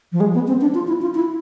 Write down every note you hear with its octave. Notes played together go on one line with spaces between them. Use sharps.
F3
G#3
B3
C4
D4
F4
E4
F4
E4